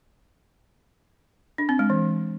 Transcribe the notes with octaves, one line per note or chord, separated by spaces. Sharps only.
D4
C4
G#3
E3